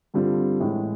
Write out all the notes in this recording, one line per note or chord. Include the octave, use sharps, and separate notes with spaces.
G2 D3 G3 C4 F4
A2 E3 G#3